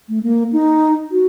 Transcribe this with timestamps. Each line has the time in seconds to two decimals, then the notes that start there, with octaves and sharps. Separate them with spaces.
0.09 A3
0.23 A#3
0.53 D#4
1.12 F#4